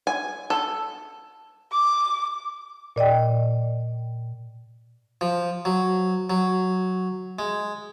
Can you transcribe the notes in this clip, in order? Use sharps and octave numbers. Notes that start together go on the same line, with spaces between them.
G#5
A4
D6
A#2 D5 D#5 G5
F3
F#3
F#3
G#3